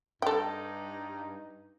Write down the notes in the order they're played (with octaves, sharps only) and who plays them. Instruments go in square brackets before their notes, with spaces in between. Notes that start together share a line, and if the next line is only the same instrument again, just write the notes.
[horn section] G2 D#4 [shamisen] A4 G5